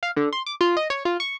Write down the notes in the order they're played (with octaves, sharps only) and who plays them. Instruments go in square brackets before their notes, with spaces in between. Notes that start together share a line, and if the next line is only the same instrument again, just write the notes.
[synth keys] F5
D3
C6
D6
F4
D#5
C#5
F4
C#6